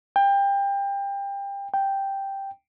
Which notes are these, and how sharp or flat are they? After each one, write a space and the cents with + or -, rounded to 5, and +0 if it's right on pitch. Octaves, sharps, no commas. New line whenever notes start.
G5 +25
G5 +0